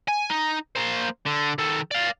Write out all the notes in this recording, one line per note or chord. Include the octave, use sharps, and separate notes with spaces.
G#5
D#4
A#3 C5
D3
D#3 A4
D5 F5